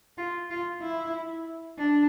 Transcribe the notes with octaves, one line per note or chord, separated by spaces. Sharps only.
F4
F4
E4
D4